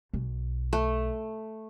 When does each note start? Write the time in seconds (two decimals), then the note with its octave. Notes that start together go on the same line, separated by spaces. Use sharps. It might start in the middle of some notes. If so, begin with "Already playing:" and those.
0.14 B1
0.73 A3